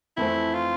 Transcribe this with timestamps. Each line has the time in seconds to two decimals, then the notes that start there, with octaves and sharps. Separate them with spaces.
0.17 F2 E3 A3 C4 E4
0.54 F4